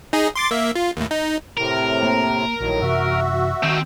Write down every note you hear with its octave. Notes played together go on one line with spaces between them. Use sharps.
D#4 G#4 D#5
C6 D6 A6
A#3 E5
F4
D#2 A2
D#4
A2 C3 A#4
A#3
A#1 A2 D#3 F#3
F#2 C3 E3 F#4 E5
D#3 C4 D#4